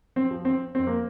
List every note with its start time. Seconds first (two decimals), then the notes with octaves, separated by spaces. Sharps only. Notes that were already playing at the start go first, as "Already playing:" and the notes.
0.16 C4
0.31 F3
0.45 C4
0.75 F2 C4
0.87 A#3